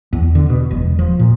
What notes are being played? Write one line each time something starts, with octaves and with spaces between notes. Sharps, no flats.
E2
D3
B2
E1
F3
A#2